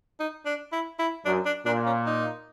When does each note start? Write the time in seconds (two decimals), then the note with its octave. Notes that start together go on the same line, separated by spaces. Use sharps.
0.20 D#4
0.46 D4
0.72 E4
0.99 E4
1.26 F#2 D4
1.46 D4
1.66 A#2 D4
1.86 C#4
2.06 D#4